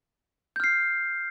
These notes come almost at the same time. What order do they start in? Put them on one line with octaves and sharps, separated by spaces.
G6 F6 C7